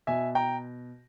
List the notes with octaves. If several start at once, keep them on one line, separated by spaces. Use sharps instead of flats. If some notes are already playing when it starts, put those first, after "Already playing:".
B2 E5 G#5
G5 A#5